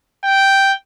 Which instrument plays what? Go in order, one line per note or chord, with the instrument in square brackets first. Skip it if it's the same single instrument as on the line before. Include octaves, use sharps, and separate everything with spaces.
[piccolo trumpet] G5